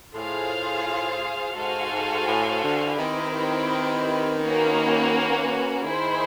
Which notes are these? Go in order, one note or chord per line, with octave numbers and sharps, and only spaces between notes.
A2 F4 G#4 C5 F5
G#2 F#4 A4 C5 F5 G#5
G#2
A2
D3
D#3 C4 E4 G4 B4
A#3 C#4 F#4 B4
D#3 E4 G#4 C5